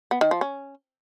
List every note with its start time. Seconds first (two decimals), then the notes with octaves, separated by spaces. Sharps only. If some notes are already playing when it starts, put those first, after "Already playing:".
0.11 B3
0.21 D#3
0.31 F3
0.41 C#4